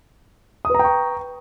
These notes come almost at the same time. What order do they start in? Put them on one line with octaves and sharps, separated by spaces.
D#6 B4 A#5 G5 C#6